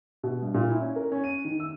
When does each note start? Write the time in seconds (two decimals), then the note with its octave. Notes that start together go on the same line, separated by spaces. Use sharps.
0.23 B2
0.42 G2
0.54 A#2
0.69 E4
0.81 C#4
0.96 A#4
1.12 C#4
1.24 D#7
1.45 D#3
1.60 E6